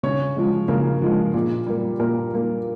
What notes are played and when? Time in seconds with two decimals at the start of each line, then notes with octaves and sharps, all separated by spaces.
0.03 C#3 C#4 C#5
0.36 F3 G#3
0.68 C#3 A#3 A#4
1.02 F3 G#3
1.34 A#2
1.66 G3 A#3
1.99 A#2 A#3 A#4
2.32 G3 A#3